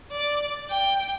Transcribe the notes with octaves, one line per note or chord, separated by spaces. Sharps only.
D5
G5